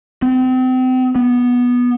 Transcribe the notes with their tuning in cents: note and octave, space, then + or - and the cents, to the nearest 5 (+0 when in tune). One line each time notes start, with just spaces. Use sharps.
C4 -35
B3 -10